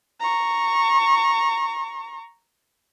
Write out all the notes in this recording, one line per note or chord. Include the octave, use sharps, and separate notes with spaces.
A#5 C#6